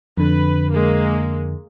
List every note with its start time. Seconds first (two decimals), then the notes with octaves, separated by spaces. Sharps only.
0.17 F2 D3 B4
0.72 G#3 A#3